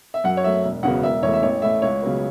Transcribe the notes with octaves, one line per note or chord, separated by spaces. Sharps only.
E5
F#2 F#5
C#5
F#3 A3 E5
E1
E2 C#3 F#3 B3 F#5
E1 E5
E2 E3 A3 C#5
E5
A1 C#5
A2 A3 E5
C#2 C#5
C#3 F#3 B3